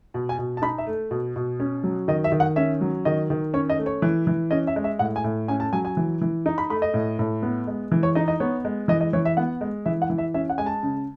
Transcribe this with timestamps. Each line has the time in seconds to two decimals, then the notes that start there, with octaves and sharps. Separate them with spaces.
0.14 B2
0.29 G#5
0.38 B2
0.57 A5
0.62 D#4 B5
0.78 E5
0.87 A3
1.11 B2
1.36 B2
1.60 C#4
1.84 F#3
2.08 D#3 D#5
2.24 E5
2.32 D#3
2.40 F#5
2.56 C#4 E5
2.81 F#3
3.05 D#3 D#5
3.30 D#3
3.54 C#4 C#5
3.70 D#5
3.78 A3
3.86 C#5
4.02 E3
4.27 E3
4.51 C#4 D#5
4.67 E5
4.76 G#3
4.84 E5
4.99 A2 F#5
5.16 G#5
5.24 A2
5.48 C#4 G#5
5.60 A5
5.73 F#3 G#5
5.85 G#5
5.97 E3
6.21 E3
6.46 D#4
6.58 B5
6.70 A3 B5
6.82 D#5
6.94 A2
7.19 A2
7.42 B3
7.67 G#3
7.92 E3
8.03 C#5
8.15 D#4 D#5
8.28 D#5
8.40 B3 C#5
8.65 G#3
8.88 E3 D#5
9.01 D#5
9.13 E3 C#5
9.25 E5
9.37 B3 F#5
9.61 G#3
9.86 E3 E5
10.02 F#5
10.10 E3
10.18 E5
10.34 C#4 E5
10.49 F#5
10.58 G#3 G#5
10.66 A5
10.83 C#3